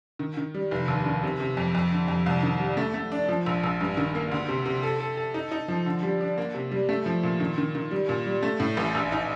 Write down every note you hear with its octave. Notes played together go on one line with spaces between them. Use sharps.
D#3
D#3
G3
F1
D#2
D#3
C3
C3
F2
F2
D3
F2
C2
D#3
G3
A3
A3
D4
F3
A#1
A#1
G2
D#3
A#3
D2
C3
C3
A4
A4
A4
D#4
D#4
F3
D3
G3
D4
A#3
C3
G3
A3
F3
A#2
D#3
D#3
D#3
G3
A#2
G3
A3
A2
A1
A#1
D#4